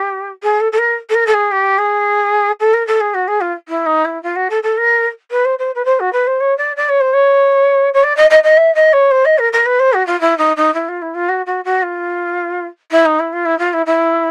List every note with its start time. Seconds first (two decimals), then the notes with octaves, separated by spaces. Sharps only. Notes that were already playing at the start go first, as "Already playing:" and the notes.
Already playing: G4
0.42 G#4
0.60 A4
0.72 A4
0.78 A#4
1.09 A4
1.14 A#4
1.26 A4
1.34 G#4
1.51 G4
1.78 G#4
2.60 A4
2.73 A#4
2.87 A4
3.00 G#4
3.14 F#4
3.27 G#4
3.41 F4
3.68 E4
3.86 D#4
4.05 E4
4.23 F4
4.36 F#4
4.50 A4
4.63 A4
4.77 A#4
5.31 B4
5.45 C5
5.59 C5
5.75 B4
5.85 C5
6.00 F#4
6.12 B4
6.27 C5
6.40 C#5
6.57 D5
6.76 D5
6.89 C#5
7.00 C5
7.13 C#5
7.93 C#5
8.03 D5
8.16 D#5
8.30 D#5
8.43 D#5
8.57 E5
8.75 D#5
8.93 C#5
9.11 C5
9.25 D#5
9.38 A#4
9.53 A#4
9.66 B4
9.79 C5
9.93 F#4
10.07 F4
10.20 E4
10.38 D#4
10.56 D#4
10.74 E4
10.88 F4
11.02 E4
11.14 F4
11.28 F#4
11.46 F#4
11.64 F#4
11.82 F4
12.91 E4
13.05 D#4
13.19 E4
13.33 F4
13.45 E4
13.59 F4
13.73 E4
13.86 E4